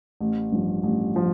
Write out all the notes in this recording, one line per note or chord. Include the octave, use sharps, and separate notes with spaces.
A1
G2 F3
A1
F3